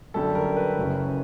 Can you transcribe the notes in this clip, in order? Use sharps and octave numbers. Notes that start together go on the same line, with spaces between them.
F#2 D3 G3 A4
A#4
B4
F#1 F#2 C#3